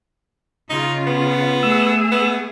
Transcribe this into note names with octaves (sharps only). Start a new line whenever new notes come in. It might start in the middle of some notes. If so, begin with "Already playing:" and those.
C#3 D#4 F4
B3
A3 G#4 E6
B3